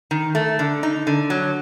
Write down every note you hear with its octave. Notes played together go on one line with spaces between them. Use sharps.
D#3
A3
D3
D#4
D3
F#3